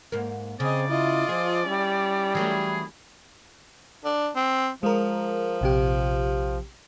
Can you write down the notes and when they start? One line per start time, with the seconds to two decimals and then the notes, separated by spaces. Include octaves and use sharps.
0.12 G#2 A#3
0.60 C#3 C4 G#4 D5 D#5
0.89 E4 F4 D#5
1.29 F3 G#4
1.67 G3 C#4 E4
2.35 E3 F#3 A3 G#4
4.05 D4
4.36 C4
4.83 F3 G#3 A#4
5.61 A#1 C3 G4